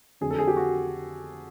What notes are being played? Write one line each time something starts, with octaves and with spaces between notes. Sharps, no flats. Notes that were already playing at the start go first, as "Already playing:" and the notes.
F2 D3 F#3 G#4
A4
G#4
G4
F#4